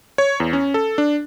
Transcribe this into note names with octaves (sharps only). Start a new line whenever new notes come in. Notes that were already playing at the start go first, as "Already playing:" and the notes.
C#5
E2
C#4
A4
D4